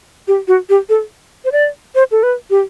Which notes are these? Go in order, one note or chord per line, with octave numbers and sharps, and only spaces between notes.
G4
F#4
G4
A4
C5
D5
C5
A4
B4
G4